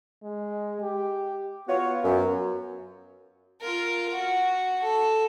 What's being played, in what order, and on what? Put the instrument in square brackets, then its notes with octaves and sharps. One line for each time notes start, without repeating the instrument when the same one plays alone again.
[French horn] G#3
G4
[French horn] B3 [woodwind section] F4 F#4 C#5
[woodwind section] F#2
[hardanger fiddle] F4 A#4
F#4
A4